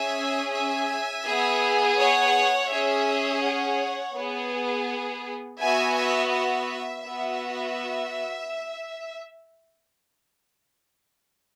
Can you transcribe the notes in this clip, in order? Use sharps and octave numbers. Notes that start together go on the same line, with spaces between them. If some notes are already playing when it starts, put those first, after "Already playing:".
Already playing: C#4 G#4 E5 G#5
E5 G#5
B3 G#4
C#5 F#5
C#4 G#4 E5
C#5 F#5
B3 G#4
B3 F#4 E5 G#5
E5
E5
B3 F#4 E5